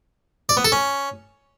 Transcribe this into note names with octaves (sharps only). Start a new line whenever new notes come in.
D5
B3
A4
C#4